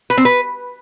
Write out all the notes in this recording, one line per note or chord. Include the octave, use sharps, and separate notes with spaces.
B4
C4
B4